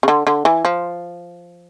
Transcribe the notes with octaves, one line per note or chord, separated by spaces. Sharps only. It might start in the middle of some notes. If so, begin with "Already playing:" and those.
C#3
D3
D3
E3
F3